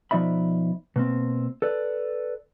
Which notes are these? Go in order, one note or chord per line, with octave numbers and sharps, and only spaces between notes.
B2 F3 D#4 D5 E5 B5
B2 A#3 C4
A4 B4 D5